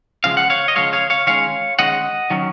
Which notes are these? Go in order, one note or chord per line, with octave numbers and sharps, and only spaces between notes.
C#3 F3 G#3 F5
F#5
C#5 F5
D#5
C#3 F3 G#3 C#5 F5
C#5 F5
C#5 F5
D#3 G#3 C#4 C#5 F5
D#3 G#3 C#4 D#5 F#5
D#3 F#3 C#4